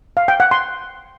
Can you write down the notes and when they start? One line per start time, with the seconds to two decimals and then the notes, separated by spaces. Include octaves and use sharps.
0.17 F5
0.28 G5
0.40 F#5
0.51 C6